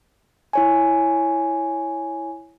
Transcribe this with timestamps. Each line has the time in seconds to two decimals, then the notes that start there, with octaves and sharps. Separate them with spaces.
0.53 E4 C#5 G#5